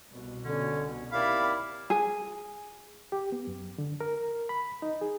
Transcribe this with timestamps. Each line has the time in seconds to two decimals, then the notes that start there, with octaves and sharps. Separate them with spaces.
0.10 C2 B2
0.45 D3 C#4
1.12 D#2 C4 E4 D5 F5 B5
1.90 G#4
3.12 G4
3.32 B3
3.47 F#2
3.78 D3
4.00 A#4
4.49 B5
4.82 D#4
5.01 G#4